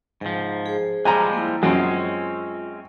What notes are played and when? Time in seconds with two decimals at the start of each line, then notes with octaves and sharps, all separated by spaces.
0.21 G#2 F3 G5
0.66 G#4 C5
1.05 F3 G3 G#3 G#5 A#5
1.33 A#3 E4
1.63 F#2 G#3 C4 C#4 F4